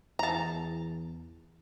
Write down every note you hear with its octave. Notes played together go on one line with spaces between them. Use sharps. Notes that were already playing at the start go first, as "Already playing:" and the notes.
E2 A5 A#5